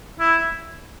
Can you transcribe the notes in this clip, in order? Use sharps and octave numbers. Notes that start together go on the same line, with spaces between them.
E4